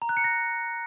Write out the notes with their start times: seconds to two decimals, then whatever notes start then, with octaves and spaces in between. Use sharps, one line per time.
0.02 A#5
0.09 F#6
0.17 C#7
0.24 A#6